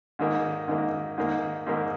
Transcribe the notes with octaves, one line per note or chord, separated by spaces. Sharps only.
G#2 D#3 A#3
G#2 D#3 A#3
G#2 D#3 A#3
G#2 D#3 A#3